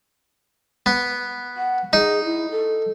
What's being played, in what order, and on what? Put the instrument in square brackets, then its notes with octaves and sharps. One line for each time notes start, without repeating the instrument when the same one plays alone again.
[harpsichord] B3
[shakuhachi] F#5
[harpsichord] D#4 [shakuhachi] G#4
[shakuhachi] E4
A4